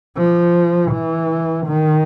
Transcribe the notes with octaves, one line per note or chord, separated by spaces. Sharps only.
F3
E3
D#3